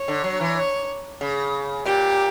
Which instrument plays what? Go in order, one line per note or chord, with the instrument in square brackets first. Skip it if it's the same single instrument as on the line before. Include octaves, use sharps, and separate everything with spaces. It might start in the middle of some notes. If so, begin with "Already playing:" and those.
Already playing: [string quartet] C#5
[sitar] D3
F#3
E3
[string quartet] C#5
[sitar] C#3
[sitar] A#2 [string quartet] G4